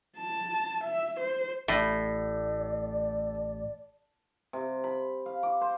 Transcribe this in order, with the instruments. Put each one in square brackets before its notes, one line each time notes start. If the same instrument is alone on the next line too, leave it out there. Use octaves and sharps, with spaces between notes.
[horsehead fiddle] A5
E5
C5
[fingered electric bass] A1 [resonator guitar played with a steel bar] A2 [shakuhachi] D5
[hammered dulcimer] C3
B5
F5
D6
C5